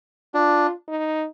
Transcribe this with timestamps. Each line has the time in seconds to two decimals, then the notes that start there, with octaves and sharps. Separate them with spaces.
0.34 D4 F4
0.89 D#4